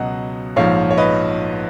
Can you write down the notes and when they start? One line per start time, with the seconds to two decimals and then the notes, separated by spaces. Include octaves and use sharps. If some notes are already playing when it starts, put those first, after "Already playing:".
Already playing: C#2 B2 F#3 D#5 F#5
0.56 A#1 G#2 F3 C#5 F5
0.91 C#5
0.97 B4 D#5